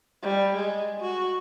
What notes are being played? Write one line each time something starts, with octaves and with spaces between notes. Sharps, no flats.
G3
G#3
F#4